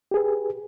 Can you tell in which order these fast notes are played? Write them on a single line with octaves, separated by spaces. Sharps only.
G4 G#4 B4